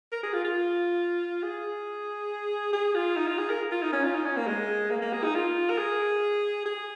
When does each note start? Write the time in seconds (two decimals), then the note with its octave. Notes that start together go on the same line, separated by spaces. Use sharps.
0.12 A#4
0.23 G#4
0.33 F4
0.45 F4
1.43 G#4
2.73 G#4
2.95 F4
3.17 D#4
3.28 F4
3.38 G#4
3.50 A#4
3.71 F4
3.82 D#4
3.93 C#4
4.04 F4
4.15 D#4
4.26 C#4
4.37 A#3
4.47 G#3
4.91 A#3
5.02 A#3
5.13 G#4
5.24 D#4
5.35 F4
5.70 A#4
5.78 G#4
6.65 G#4